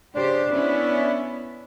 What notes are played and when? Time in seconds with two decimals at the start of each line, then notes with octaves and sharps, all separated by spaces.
0.15 C#3 D4 G4 C5
0.52 B3 C#4 E4